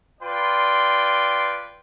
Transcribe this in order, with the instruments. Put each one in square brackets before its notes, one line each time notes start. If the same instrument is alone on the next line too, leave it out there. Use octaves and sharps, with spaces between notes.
[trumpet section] F4 B4 D5 G5 C6